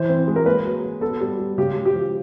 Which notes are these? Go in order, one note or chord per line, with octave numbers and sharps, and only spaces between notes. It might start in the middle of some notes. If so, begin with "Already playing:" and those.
Already playing: E3 C5
C4
G#3
A#4
A#3 B4
F#3
F#3
B3 A4
G3
G3
C#3 G4
G#3
G4
F3